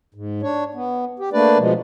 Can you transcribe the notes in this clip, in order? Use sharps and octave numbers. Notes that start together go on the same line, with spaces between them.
G#2
D4 C#5
B3
G4
A3 A#3 D4 B4 D5
B2 F3 G#3